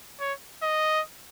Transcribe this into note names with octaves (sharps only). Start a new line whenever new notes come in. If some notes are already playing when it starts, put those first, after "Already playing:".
C#5
D#5